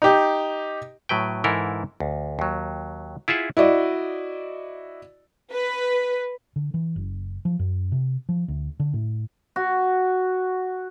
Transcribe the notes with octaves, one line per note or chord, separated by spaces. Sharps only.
D#4 G4
A2 F#3 B4 G5
G#2 E3 E4 A4 A#4
D2
D#2 F#3
E4 F4 G#4 E5 F#5
E4 F#4 D5 D#5
B4
D3
E3
F#1
F3
F#2
C3
F3
D2
D3
A2
F#4